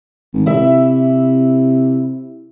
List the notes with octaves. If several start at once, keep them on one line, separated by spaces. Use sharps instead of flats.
G#1
C3 E4 E5